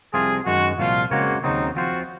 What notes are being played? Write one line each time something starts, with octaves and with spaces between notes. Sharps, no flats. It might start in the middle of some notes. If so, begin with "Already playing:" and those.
C2 C3 F3 C4 F4 G#4
F#2 D#3 G#3 F#4
C2 A#2 F3 F4
C#3 G#3 A#3 C4 F#4 C#5
D#2 C#3 F#3 C4 D#4
F3 C4 F4 F#4 C5